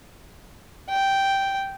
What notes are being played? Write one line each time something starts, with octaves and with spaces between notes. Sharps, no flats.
G5